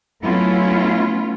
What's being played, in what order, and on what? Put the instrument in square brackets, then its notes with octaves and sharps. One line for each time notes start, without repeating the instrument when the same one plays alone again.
[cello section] F#3 A3 B3 C#4 E4 F4